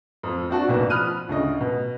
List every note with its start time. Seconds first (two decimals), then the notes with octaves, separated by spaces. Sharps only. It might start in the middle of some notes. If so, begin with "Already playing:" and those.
0.23 F2 F3
0.49 C4 D4 F#4 A5
0.68 F#1 B1 B2 D5
0.90 F3 B5 D#6 F6 F#6 D#7
1.29 D2 C#3 D#5
1.61 B2